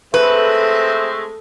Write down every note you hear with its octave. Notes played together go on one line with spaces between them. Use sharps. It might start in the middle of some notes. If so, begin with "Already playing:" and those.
G#3 A3 C4 A4 B4 E5